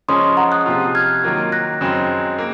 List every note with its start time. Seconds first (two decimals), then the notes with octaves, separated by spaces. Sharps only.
0.08 C#3 F3 G#3 C#4 C6 D#6
0.37 F#5 A#5
0.52 D#6 F#6
0.66 C3 F3 C4 F4
0.95 F6 G#6
1.24 D#3 F#3 A#3 F4
1.52 F#6 A#6
1.81 F#2 C#3 G#3 C4
2.38 A#3